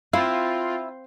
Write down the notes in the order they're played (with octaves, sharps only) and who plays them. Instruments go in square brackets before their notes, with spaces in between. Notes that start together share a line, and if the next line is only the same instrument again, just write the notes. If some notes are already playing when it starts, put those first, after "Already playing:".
[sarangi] C4 [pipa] E4 [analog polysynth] F4 [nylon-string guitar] F5